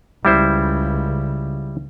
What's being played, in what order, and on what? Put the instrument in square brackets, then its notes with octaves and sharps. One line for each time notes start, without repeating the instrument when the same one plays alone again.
[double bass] C#2 C#3 [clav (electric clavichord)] G3 E4 C5